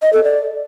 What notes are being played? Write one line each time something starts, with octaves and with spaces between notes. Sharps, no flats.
D#5
A4
D5